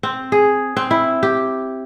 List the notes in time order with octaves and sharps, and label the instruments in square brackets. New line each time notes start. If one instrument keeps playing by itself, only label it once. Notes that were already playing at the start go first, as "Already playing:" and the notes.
[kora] C4
G#4
C4
E4
G4